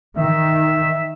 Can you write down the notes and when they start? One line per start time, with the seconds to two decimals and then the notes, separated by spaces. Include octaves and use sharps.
0.17 D#3 E5